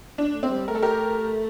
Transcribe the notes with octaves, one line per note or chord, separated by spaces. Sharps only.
D4
A3
C4
G3
A3 A#4
A4
G4 A#4